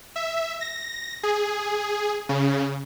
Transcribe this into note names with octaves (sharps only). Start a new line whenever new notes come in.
E5
A#6
G#4
C#3